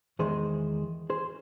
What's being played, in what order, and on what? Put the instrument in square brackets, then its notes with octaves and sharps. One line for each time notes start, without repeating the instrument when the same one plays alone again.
[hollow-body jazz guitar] E2 D#3 G#3 G#4 C5
G#4 C5